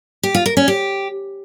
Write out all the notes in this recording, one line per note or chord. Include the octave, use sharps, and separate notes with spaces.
G4
F4
A#4
C#4
G4